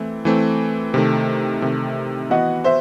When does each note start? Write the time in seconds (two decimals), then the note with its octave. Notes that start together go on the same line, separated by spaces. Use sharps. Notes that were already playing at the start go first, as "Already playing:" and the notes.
Already playing: E3 A3 C4
0.25 E3 A3 C4
0.94 C3 D#3 A3
1.62 C3 D#3 A3
2.30 E3 B3 F#4 B4 D#5 F#5
2.64 C5 E5